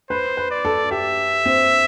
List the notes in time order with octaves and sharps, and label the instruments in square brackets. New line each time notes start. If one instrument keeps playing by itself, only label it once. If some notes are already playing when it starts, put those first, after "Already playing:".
[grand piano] B4 [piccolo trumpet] C5
[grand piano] B4
[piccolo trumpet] D5
[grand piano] A4
[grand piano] G4 [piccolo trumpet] E5
[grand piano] C4